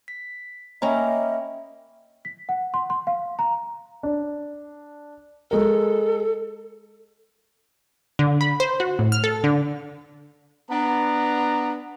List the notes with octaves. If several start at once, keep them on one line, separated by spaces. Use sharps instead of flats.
B6
A#3 C#4 D#5 E5 G5 A#5 B5
B6
F#5
C6
C6
F5
A#5
D4
G#3 A4 A#4
D3
B5
C5
F#4
A2
F6
A4
D3
B3 D4 A#5